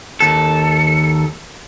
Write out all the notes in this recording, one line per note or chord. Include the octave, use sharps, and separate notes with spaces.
D#2 A4